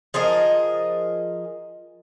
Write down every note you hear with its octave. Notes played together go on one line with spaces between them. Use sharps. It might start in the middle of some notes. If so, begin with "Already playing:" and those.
F3 G#4 A#4 D#5